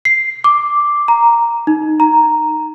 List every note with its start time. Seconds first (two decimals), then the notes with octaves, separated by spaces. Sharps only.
0.05 C7
0.44 D6
1.08 A#5
1.67 D#4
2.00 A#5